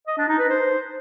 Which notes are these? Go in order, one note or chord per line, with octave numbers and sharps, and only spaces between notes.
D#5
D4
D#4
B4
C5